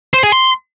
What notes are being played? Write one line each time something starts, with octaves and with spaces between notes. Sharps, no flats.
C5
G#4
C6